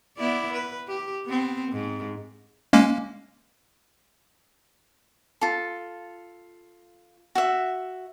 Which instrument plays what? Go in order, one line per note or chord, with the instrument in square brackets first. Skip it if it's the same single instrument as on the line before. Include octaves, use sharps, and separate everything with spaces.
[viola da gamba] B3 E4 D5
B4
G4
B3 C4
G#2
[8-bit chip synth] G#3 A#3 C#4
[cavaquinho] F4 A4
F#4 E5